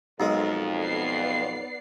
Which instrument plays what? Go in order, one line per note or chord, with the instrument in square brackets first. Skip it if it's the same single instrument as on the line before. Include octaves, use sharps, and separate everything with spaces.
[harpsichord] B1 G#3 [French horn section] F2 [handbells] D#4 A#4
[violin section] B3 D5 C7